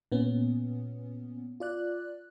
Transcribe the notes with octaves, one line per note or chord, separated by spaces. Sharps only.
A#2 B3 C#4
F4 D5 F#6